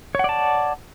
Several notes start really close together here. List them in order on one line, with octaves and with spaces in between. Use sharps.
C#5 F#5 D5 A5